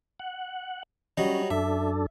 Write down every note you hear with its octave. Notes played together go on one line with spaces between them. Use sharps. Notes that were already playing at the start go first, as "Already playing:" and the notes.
F#5
F#3 G3 C#4 D#5
F#2 D4 A4 E5